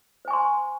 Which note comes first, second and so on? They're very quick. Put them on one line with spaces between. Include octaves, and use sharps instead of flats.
C5 G#5 C#6 C6